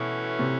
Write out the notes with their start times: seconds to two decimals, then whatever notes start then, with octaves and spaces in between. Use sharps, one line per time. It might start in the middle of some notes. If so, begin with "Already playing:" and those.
Already playing: B2 E3 A3 C#4
0.39 C3